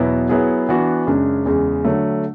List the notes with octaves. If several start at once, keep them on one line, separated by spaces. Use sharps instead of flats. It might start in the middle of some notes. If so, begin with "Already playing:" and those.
Already playing: E2 B2 F#3 B3 E4
F#3 B3 E4 G#4
E3 B3 D4 F#4
F#2 C#3 G#3 D4
E2 C#3 G#3
D3 F#3 A3